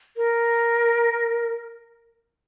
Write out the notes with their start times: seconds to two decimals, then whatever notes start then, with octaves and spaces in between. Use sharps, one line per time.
0.17 A#4